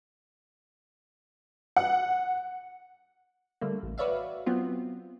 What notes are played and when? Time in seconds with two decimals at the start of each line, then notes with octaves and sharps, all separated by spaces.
1.76 F#5
3.61 D3 G3 A3 A#3
3.83 A1
3.98 F#4 B4 C#5 D5 E5 F5
4.46 F#3 B3 C4 F4